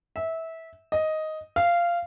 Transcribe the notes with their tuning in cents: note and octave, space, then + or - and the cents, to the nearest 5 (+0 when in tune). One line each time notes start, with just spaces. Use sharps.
E5 -20
D#5 +5
F5 -15